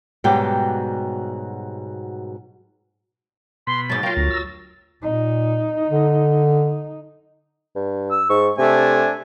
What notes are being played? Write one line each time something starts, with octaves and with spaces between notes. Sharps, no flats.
G#2 B2 F#3 G3 G4
B2 B5 C6
G#2 F#3 A6
F#3 F4 A#4 F5 G5
D2
E6
A#2 D#4
D3
G2
E6
G#2 C#6
C3 A3 D4 G#5